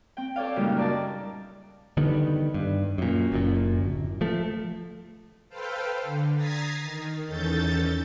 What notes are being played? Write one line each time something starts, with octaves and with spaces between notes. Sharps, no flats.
C4 G5
A4 C#5 D5 F5
F#2 A#2 C#3 G3 G#3 D#4
A#4 D5 A5
D3 D#3 G3 B3
G2
F#2 A#2
F#1 F#2 A#2
D1
F3 A3
A4 B4 C5 F5 G5
D3
A#5 D#6 G#6 A6 B6 C7
D#3
E2 D#3 C#4 A4 G6 A6